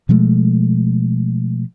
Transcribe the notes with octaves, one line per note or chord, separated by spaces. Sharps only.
B2 F3 G#3 A3